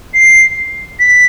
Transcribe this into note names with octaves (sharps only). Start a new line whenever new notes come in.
C7
B6